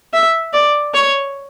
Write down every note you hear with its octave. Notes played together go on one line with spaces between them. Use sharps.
E5
D5
C#5